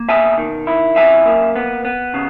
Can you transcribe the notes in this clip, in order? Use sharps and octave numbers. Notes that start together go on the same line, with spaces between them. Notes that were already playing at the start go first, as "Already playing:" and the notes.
Already playing: A#3
B2 E5 G#5
D#3
E4
F#2 E5 G#5
A#3
B3
B3
C#3